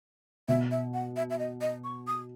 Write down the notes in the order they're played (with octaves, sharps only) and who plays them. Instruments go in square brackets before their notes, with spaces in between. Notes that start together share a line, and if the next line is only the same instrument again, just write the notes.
[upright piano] B2 [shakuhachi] E5
[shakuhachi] E5
F#5
E5
E5
D#5
D#5
C#6
D#6